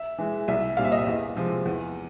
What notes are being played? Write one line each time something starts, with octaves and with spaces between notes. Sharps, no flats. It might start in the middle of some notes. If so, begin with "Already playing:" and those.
Already playing: E5
E3 G#3
C2 E5
A#2 G3 C4 F5
E5
D#5
E5
E2
C3 F3 G#3 C4
E2